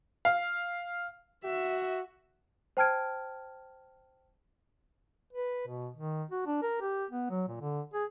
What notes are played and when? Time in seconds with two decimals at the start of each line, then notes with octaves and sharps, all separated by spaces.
0.25 F5
1.44 F#4 E5
2.77 C5 G5 A5 F6 G#6 D7
5.33 B4
5.67 B2
5.96 D#3
6.31 F#4
6.46 D4
6.62 A#4
6.81 G4
7.11 B3
7.30 F#3
7.48 A#2
7.61 D3
7.94 G#4